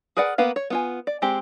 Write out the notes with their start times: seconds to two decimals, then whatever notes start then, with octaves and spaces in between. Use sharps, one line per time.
0.17 G#4 A#4 B4 D5 F#5
0.38 A#3 B3 B4 F5
0.56 C#5
0.70 B3 F4 G#5
1.07 D5
1.22 G#3 C4 G4